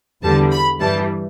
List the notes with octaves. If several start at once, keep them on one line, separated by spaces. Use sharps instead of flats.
E2 D3 G3 A5
B5
G2 E3 G3 A5